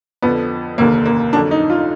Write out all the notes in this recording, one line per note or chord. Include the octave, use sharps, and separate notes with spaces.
F2 D3 F3 B3
F1 D#2 D3 A#3
A#3
F2 D3 F#3 D4
D#4
F4